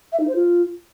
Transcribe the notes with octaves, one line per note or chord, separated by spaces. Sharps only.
E5
D#4
C5
F4